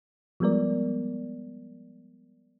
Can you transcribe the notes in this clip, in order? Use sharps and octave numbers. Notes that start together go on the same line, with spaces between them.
F3 G3 G#3 B3 A#4 D5